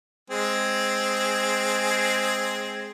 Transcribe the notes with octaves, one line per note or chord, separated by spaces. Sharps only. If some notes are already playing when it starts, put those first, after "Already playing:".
G#3 C4 G#4